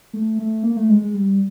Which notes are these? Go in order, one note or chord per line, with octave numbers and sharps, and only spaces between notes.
A3
A3
A#3
A3
G#3
G#3
G3